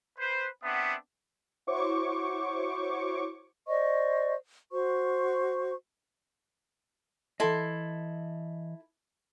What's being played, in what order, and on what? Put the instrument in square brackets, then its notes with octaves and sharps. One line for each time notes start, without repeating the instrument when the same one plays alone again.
[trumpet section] B4 C5
B3 C4 D4 E5 F#5 D#6
[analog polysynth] E4 F#4 C5 C#5 C#6 D6
[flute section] C5 D5 D#5 C#6
F#4 C5 C#6
[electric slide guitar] E3 D#5 [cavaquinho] E4 A4 C6